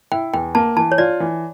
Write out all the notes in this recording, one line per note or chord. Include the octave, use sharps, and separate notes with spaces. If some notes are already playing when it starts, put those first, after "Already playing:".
E4 G5
E2 G5
A#3 A5
E3 A5
C#5
F4 D5
E3